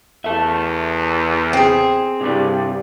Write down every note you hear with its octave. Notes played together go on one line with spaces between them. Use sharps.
E2 A4 E5
C4 G#4
G2 C3 G3